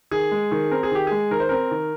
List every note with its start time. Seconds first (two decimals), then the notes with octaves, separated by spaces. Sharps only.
0.11 D#3 G#4
0.31 G#3
0.51 D#3
0.71 C4 A#4
0.83 G#4
0.91 D#3 G4
1.07 G#3 G#4
1.31 D#3 A#4
1.40 C5
1.49 C4 A#4
1.71 D#3